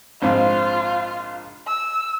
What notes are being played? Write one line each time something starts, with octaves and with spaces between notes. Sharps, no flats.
A#1 G#2 C4 F4
E6